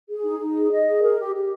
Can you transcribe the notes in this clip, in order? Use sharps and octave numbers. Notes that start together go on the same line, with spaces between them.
G#4
D#4
D#4
G#4
D#5
G#4
A#4
G4
G4